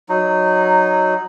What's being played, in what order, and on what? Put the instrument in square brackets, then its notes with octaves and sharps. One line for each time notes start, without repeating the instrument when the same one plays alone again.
[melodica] F#3 D#4